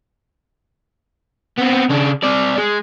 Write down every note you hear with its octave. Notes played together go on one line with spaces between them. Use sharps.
B3 C4
C#3 D4
C4 D5
G#3